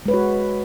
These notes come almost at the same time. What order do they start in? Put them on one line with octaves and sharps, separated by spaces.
G#3 B4 C#5 F#4